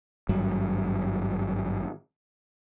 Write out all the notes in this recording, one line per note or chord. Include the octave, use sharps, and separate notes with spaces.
G#1 G2 F#3